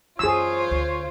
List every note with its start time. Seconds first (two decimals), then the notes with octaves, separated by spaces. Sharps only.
0.19 F#2 E3 F4 G#4 C5 C#5 E6
0.71 D2